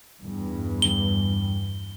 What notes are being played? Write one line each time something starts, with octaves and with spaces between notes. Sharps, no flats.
E2 G2
G7